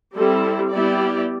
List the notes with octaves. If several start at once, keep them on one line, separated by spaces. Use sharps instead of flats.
G3 C4 E4 A4
G3 B3 E4 G4 D5